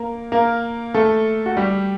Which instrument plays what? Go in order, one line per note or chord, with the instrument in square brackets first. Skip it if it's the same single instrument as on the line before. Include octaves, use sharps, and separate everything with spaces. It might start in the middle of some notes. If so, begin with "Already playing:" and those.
Already playing: [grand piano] A#3 A#4
A#3 A#4
A3 A4
F#4
G3 G4